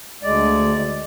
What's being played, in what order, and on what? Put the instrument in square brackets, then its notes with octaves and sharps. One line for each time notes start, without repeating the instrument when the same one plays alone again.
[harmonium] D2 G#3 D5